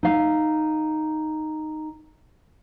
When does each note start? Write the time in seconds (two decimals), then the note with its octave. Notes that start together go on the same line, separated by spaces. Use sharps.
0.03 D#4 F5